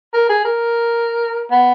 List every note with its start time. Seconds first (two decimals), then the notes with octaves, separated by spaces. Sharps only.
0.14 A#4
0.29 G#4
0.45 A#4
1.51 B3